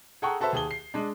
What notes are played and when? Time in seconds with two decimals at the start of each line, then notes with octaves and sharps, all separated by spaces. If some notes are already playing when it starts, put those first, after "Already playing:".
0.22 G#4 A4 F#5 G5 A#5 C#6
0.41 F#4 A4 B4 C5 E5
0.53 D#2 G#4 A5 G7
0.71 C7
0.94 G#3 D4